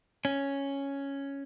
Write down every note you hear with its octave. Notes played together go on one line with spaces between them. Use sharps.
C#4